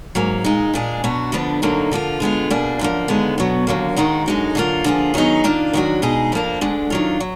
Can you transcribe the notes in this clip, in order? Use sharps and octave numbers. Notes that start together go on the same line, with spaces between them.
G#2 F#3 A#3
A#2 G#3 D#4
A#2 G#3 D4 G#4
B2 F#3 D4 F#4
D2 D3 F3 B3 D4
D2 D3 F#3 A#3 D#4
D3 F3 A#3 F4
D3 G#3 B3 F4
B2 A#3 D4 G#4
F#2 D3 F3 A#3
D#2 D3 G#3 B3
B2 F#3 B3
D#2 D3 F#3 A#3
D#2 D#3 G#3 D#4 F#4
F#2 D3 G#3 D#4 F#4
D3 F#3 A#3 F4
D3 F3 A#3 F4 G#4
D#3 F#3 B3 D#4 G#4
D#3 A#3 D4 F4
F#2 D#3 F#3 D4 F#4
B2 G#3 D#4 G#4
F2 F3 A#3 D4
D2 D3 G#3 D4
D#3 F#3 D4 F4
F#3